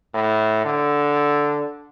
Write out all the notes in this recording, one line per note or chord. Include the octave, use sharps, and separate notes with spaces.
A2
D3